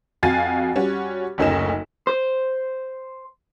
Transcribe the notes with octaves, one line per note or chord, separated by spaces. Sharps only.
F2 F#4 F5 G#5 A6 D#7
G3 C#4 F#4
F#1 D2 C#4 D#4 D#5 E7
C5